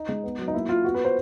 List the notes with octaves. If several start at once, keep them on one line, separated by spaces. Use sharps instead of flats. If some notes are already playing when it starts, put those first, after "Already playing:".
Already playing: D#4
G#3
B3
F#3
D#4
A#3 E4
A#3 F4
B3 F#4
B4
C5